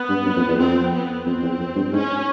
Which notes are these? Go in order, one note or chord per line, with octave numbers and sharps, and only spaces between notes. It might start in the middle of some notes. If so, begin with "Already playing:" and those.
Already playing: B3
G2
F#2
F2
E2
F2 C4
B3
F2 C4
E2
F2
G2
G#2 C#4